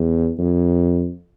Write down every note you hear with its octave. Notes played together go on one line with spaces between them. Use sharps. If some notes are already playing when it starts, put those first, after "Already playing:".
Already playing: E2
F2